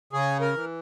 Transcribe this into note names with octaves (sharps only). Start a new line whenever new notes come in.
C#3 G#4
A#4
E3